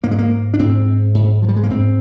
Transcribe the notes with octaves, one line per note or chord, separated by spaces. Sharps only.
G#2 A#3
G#3
A#3
D4
G#2 C4
G#2
F3
G3
G#3
A#3
G#2 C4